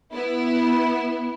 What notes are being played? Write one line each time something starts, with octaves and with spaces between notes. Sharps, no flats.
B3 E4